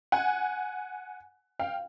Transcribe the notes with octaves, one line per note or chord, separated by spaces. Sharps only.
F#5 G#5
F5 G5